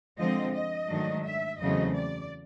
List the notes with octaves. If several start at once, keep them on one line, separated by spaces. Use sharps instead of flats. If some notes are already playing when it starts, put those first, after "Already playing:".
D3 F3 G#3 C4 D#5
D#5
G#2 D#3 F#3 A3 D4
E5
E2 C#3 F#3 A3 C4 D#5
D5